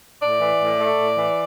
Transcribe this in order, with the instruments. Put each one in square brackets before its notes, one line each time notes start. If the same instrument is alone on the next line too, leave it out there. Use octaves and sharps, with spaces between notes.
[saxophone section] A2 D5
E3
A2
A3
A2
E3